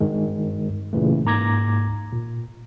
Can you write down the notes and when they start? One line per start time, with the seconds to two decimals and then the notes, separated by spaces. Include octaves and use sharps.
0.01 G2 D#3 G#3
0.93 A#2 C#3 E3 A3
1.25 G#2 A#3 A#5 D6 G#6 A#6
2.12 A#2